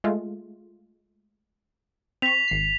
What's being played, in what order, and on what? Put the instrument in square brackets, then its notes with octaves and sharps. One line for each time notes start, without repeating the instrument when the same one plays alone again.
[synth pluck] G#3 A3 F4
[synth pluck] C4 C#6 [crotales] B6 F7
[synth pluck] G#1 C7